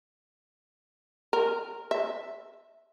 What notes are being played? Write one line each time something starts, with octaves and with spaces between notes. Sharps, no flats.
A#4
E5